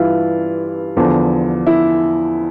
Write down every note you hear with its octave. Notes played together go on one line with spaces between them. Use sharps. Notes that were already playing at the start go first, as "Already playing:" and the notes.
Already playing: G2 E3 E4 F4
E2 D3 F3
E4